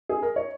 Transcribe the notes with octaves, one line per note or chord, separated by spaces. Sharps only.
G#4
A#4
C#5